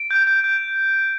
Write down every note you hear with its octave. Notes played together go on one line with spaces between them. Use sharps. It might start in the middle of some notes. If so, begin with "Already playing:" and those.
Already playing: D7
G6
G6
G6